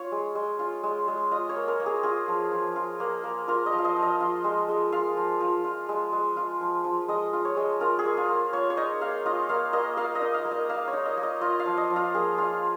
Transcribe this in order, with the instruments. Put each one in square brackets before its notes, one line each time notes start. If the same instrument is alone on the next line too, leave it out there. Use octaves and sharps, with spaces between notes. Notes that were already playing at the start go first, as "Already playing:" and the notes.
Already playing: [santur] F4 C#5
G#3
G#3
F4
G#3
G#3
F4 D#5
C#5
A#3
A#4
A#3
G#4
F4 G#4
F3
F3
F4
A#3
A#3
F4 A#4
D#5
F3
F5
D#5
F3
D#5
F4
G#3
G#3
F4 F5
F3
F3
F4
G#3
G#3
F4
F3
F3
G#3 D#5
F4
C#5
G#3
F4 A#4
G#4
A#3
F4
A#3
A#3 C#5
C#5
D#4 D#5
A#3 F5
F4 D#5
A#3 F5
A#3 D#5
A#3 F5
D#5
D#4
F5
A#3
D#5
A#3 F5
C#5
D#4
D#5
A#3
D#5
F4 D#5
F5
F3
D#5
F3
F4
A#3 G#4
F4